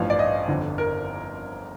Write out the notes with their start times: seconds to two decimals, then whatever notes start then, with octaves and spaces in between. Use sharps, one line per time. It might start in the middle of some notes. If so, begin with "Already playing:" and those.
Already playing: A1 G2 F3 F5
0.10 D5
0.19 D#5
0.48 G1 F2 D3
0.78 A#4